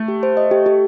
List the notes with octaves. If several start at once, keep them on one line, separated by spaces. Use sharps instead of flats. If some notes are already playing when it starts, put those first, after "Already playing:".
Already playing: A3
G4
C5
D#5
G4
G4